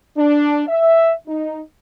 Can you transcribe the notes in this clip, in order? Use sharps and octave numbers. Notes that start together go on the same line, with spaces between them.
D4
E5
D#4